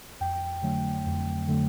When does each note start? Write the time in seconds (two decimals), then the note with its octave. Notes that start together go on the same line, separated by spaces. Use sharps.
0.20 F2 G5
0.63 D3 F#3 A3
1.06 F2
1.48 D3 F#3 A3